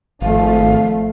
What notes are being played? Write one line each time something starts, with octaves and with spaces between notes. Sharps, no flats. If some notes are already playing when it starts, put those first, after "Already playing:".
G#1 F3 A3 F5